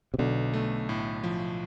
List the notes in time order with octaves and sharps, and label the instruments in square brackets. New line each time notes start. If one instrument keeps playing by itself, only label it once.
[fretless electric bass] C3
[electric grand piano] B1 [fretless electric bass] B2 D3
[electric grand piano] A3
A2
F3